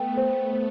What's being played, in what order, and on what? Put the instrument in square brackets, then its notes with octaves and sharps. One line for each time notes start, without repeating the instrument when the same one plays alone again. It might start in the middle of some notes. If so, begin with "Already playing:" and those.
Already playing: [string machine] A3 B3 [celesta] G5
[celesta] C5
C5